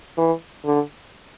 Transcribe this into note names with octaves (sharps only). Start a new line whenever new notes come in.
E3
D3